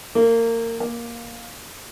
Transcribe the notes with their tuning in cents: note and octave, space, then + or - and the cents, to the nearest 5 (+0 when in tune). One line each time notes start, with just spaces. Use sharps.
A#3 -25
A#3 +10